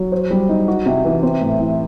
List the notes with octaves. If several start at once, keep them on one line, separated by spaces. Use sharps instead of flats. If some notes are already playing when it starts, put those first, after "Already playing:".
Already playing: F#3
C5
G3
D#4
F#4
C3
E3
C4
A2
E3